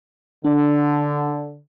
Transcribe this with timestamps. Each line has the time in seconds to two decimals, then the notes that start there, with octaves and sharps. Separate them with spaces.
0.45 D3 D4